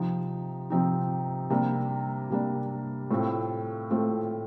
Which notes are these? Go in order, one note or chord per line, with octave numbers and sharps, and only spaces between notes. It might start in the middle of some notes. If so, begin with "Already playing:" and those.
Already playing: C3 F3 C4 D#4
C3 F3 C4 D#4
C3 G3 A#3 D4
C3 G3 A#3 D4
A2 A3 C4 F4
A2 A3 C4 F4